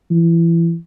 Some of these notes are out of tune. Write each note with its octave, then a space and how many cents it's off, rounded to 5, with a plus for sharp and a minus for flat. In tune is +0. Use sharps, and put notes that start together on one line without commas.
E3 +25